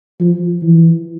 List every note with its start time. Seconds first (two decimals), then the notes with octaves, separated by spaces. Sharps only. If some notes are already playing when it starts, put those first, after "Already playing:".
0.20 F3
0.63 E3